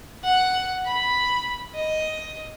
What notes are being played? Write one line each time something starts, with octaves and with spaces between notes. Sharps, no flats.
F#5
B5
D#5